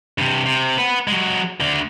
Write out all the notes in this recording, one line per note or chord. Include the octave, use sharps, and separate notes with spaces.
G2 C3
C3
B4 F#5
F#3 G#3
D2 D3